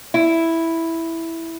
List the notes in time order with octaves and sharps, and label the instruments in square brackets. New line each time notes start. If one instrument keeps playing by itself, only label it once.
[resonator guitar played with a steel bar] E4